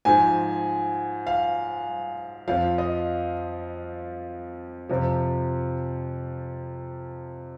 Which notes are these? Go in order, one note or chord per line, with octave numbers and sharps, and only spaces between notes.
G#2 F3 G#5
F5
F2 F3 F5
D#5
F2 C3 F3